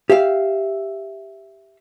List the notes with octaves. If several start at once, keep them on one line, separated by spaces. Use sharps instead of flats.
G4 E5 F5